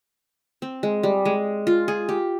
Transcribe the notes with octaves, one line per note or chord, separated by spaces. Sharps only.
C4
G#3
G3
G#3
F4
G#4
G4